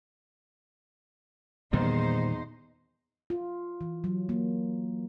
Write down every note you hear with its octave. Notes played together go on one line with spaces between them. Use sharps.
E2 A#2 D#3 G3 D#4 C5
F4
E3
F#3
A#3